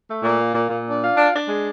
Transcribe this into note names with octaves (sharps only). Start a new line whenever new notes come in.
A3
A#2
A#3
A#2
A#2
D4
F4
D4
D4
G#3